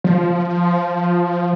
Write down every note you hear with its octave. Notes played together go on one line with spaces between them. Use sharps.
F3